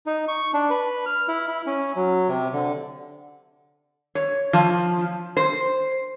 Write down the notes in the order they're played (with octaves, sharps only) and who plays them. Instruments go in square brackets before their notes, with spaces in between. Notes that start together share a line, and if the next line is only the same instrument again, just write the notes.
[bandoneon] D#4
C#6
D4
B4
F6
E4
E4
C#4
F#3
C3
D3
[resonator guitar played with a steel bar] C#5
F3
C5